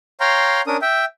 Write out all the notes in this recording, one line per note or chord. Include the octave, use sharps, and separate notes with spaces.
C#5 F5 G5 A#5 C6
C#4 D4 A#4 D#6
E5 G5